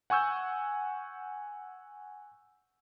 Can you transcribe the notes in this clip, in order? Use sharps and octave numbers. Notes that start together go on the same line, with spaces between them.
F#5 G#5 C#6 E6 G6